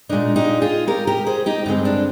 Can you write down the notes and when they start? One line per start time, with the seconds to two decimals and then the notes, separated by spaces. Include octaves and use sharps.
0.09 A#2 G#3 D4 D#4
0.36 D#4 G4
0.62 F4 G#4
0.87 G4 A#4
1.07 G4 A#4
1.26 G#4 C5
1.46 D#4 G4
1.66 G2 D3 F3 G#3 C4 D#4
1.85 D4